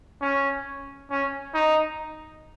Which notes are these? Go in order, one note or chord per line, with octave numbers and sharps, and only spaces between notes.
C#4
C#4
D#4